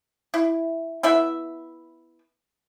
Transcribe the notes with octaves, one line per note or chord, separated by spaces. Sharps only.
E4
B3 E4 B4 E5